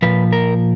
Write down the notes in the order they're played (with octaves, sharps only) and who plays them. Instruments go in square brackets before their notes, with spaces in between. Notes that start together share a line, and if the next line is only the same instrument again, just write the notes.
[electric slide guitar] A#2 F3 B4
A#4